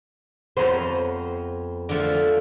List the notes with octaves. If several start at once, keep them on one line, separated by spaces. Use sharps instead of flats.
F2 B3 C5 A#5
D3 F3 A3